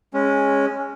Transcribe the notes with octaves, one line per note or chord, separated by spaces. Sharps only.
G#3 C#4